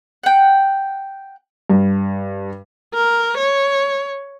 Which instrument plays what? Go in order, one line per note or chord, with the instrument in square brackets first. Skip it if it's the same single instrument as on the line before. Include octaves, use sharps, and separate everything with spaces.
[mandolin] F#5 G5
[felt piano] G2
[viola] A#4
C#5